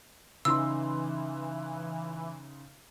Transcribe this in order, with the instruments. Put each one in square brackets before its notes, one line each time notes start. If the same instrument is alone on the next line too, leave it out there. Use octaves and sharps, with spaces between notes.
[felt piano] C#3 D#4 C6 [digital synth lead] E3 [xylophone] E6